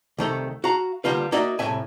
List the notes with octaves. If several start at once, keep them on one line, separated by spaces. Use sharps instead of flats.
C2 D#3 A3
F#4 F5 A#5
D3 G3 A#3 F4 B4
A#3 D#4 F#4 D5 E5
C2 F2 A2 E5 G#5